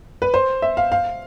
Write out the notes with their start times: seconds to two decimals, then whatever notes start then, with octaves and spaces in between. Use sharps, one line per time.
0.22 B4
0.34 C5
0.62 E5
0.77 F5
0.92 F5